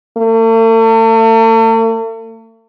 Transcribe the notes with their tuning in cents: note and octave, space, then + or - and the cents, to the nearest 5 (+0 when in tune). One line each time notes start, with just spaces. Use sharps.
A3 +45